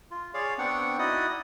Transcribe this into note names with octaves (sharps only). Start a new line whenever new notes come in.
F4
G#4 C#5 D5 F5
B3 C4 D4 F#5 G5 C#6
D#4 E4 F#4 D5 D#5 D#6